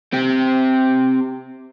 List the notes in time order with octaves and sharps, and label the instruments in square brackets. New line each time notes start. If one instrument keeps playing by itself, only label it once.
[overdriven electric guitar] C4 G4